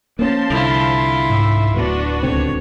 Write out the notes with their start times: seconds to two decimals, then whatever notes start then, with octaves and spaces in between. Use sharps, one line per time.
0.19 F3 A#3 C#4 A5 C6
0.50 C2 D3 E4 F4
1.30 G#2 E5
1.74 D1 A2 B3 D4 F#4 B4
2.23 C#2 D3 C4 C#5